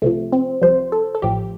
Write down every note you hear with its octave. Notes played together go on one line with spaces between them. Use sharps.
C2 C3 F3 A3
C4
C2 C3 F3 C5
A4
A4
A1 A2 F3 G4